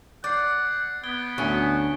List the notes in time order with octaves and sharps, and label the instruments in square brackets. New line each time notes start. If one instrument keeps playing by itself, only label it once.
[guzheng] D5 [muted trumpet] F#5 [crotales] G6 A6 C7
[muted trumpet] B3 [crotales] G#6 D7 G7
[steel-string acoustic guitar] D2 [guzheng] C#4 [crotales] C#6